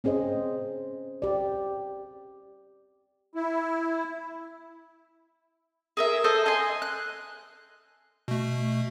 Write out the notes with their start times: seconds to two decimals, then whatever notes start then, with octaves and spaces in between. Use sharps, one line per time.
0.04 C4 C#4 G#4 C5 D#5
1.22 G4 D5
3.35 E4
5.97 G#4 A#4 E5
6.24 A4 C5 D#5 A5
6.46 D#5 G#5 C6
6.82 F#6
8.28 B2 A3